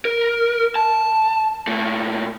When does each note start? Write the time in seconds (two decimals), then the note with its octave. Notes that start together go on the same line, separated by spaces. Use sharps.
0.05 A#4
0.75 A5
1.67 A#2 A3